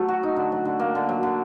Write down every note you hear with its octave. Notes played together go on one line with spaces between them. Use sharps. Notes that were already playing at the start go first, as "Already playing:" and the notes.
Already playing: F#3 A3
F#4
D#4
D3
F#3
D3
A#3
D3
F#3
D3